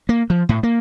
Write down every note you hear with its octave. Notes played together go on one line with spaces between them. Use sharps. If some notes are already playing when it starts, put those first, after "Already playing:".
A#3
F3
A2
A#3